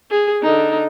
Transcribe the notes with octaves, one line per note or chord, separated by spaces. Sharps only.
G#4
D3 D#4